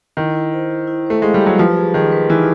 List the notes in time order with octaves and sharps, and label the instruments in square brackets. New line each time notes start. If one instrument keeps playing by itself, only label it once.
[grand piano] D#3 [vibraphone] E4
[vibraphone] E4
C5
E4
E4
[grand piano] A3 [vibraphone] C5
[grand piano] G#3 [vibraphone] F5
[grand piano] G3
[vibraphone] G4
[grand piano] F#3
[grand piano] F3 [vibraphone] B4
[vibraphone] G#4
[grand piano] D#3 [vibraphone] G#4
[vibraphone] B4
[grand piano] E3 [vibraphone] D#4